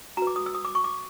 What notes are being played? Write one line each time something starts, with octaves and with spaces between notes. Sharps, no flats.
F#4 B4 A#5
D6
D#6
E6
D#6
D6
C#6
D6